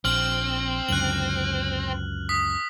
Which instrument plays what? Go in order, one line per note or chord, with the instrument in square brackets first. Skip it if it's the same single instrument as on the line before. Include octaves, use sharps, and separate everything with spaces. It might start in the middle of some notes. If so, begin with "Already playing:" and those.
[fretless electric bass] A#1 [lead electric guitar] C4 [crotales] F6 F#7
[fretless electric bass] C#2 F#2 D3 [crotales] F#6 F#7
[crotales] D#6 B6